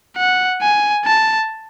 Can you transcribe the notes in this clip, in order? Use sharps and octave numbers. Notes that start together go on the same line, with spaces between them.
F#5
G#5
A5